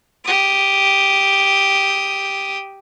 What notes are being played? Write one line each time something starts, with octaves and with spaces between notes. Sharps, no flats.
G4 D#6